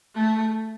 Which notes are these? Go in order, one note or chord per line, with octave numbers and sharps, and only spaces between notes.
A3